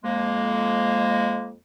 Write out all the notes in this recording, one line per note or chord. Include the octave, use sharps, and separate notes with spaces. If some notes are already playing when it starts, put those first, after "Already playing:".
F2 G#3 A#3